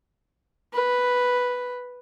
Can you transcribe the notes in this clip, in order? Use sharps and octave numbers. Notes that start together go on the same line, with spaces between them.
B4